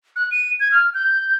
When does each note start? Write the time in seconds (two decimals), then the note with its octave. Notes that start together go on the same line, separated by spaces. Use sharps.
0.16 F#6
0.31 D#7
0.60 G#6
0.72 F6
0.94 G6